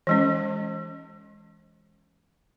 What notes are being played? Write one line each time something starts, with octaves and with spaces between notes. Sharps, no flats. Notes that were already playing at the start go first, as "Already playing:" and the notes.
E3 G#3 C#4